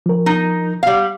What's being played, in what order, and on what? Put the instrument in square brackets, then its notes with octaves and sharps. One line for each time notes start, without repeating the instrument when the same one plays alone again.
[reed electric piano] F3 A#4
[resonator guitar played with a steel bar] D#4
G3 F5